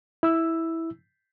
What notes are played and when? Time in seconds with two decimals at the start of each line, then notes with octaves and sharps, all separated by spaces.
0.23 E4 E6